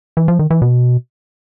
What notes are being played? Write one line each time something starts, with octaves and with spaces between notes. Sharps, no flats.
E3
F3
D#3
E3
B2